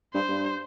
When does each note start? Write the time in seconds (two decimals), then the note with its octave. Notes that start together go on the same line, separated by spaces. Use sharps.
0.14 G2 C5
0.29 G2